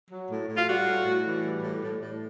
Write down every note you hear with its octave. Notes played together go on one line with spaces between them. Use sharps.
F#3
A2
A2
F4
G3 F#4
A2
A2
E3
G3
A2
A2
A2